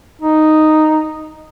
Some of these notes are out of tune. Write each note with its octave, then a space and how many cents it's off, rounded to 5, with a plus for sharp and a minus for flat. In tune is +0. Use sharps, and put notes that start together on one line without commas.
D#4 -5